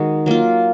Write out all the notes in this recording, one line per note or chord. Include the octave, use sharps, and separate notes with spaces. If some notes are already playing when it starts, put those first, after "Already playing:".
Already playing: D#3 G#3 D#4 F#4
F#3 A#3 F4